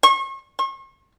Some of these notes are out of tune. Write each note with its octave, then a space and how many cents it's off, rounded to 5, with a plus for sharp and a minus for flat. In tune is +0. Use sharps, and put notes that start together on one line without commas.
C#6 -40
C#6 -45